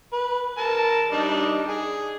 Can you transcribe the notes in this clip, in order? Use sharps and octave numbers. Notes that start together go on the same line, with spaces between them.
B4
A#4 A5
G3 D4 D#4
G#4 G#5